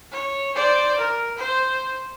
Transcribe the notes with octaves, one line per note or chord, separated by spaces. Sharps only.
C#5
C5 D5
A#4
C5